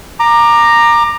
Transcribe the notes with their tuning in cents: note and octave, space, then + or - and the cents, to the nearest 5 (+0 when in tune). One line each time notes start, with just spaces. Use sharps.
A#5 +0 D6 +25